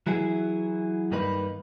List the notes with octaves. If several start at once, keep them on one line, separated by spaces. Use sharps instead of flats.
E3 F#3 E4 G#4
G2 D#3 A#3 D#4 B4 B5